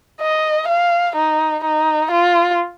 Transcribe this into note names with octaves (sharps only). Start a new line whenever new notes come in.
D#5
F5
D#4
D#4
F4